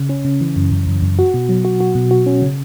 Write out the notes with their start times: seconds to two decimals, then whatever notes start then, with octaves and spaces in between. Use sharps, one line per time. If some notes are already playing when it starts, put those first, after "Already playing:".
Already playing: C#3
0.09 C#4
0.25 C#3
0.41 E3
0.56 F#2
0.71 F#2
0.87 F#2
1.02 F#2
1.19 F#4
1.34 B2
1.49 F#3
1.65 F#4
1.80 F#4
1.95 B2
2.11 F#4
2.26 C#4
2.42 C#3